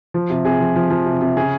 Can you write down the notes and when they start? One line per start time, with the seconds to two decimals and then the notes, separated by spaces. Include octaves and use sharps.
0.14 F3
0.30 C3
0.45 C3 G#4
0.60 F3
0.76 F3
0.90 F3
1.06 C3
1.21 C3
1.37 C#3 G#4